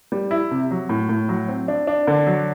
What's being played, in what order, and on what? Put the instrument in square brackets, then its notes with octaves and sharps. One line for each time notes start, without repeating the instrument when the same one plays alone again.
[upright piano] G3
E4
C3
F#3
A2
A2
F#3
C4
D4
D4
D3
F#3